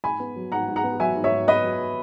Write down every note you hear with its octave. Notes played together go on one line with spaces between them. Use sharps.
G#2 G#5 B5
B3
F#3
G#2 F#5 A#5
G#2
F#5 A#5
B3
F#3 E5 G#5
G#2
C#5 E5
G#2
B3 B4 D#5
F#3